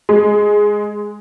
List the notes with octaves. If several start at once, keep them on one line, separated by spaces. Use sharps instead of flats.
G#3